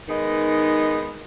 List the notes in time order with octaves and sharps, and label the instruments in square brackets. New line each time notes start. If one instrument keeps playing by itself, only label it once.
[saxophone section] D#3 G#3 B3 D#4